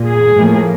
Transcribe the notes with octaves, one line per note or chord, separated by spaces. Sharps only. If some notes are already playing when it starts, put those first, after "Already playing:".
Already playing: A#2
G#4
A2 F3 A#3